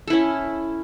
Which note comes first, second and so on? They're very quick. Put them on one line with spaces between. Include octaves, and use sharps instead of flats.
A4 E4 C#4